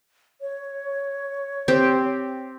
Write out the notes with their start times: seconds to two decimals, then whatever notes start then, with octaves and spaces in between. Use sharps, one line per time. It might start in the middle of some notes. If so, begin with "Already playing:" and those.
0.41 C#5
1.68 C4 G4